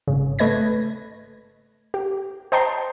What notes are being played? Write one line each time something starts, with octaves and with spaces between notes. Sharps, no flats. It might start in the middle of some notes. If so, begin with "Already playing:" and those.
G#1 C#3
A3 B4 D#5 G#6 A#6
G4
C5 D#5 G5 A5 A#5 C6